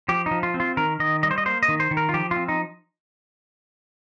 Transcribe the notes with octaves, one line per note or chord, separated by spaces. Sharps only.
F3 G4
D#4
F3
F4
C4
F4
D#3 A#4
D#3 D#5
G3 D#5
C5
D#5
A#3 C5
D#5
D#3
C5
D#3
A#4
F4
F3 G4
F4
C4
D#4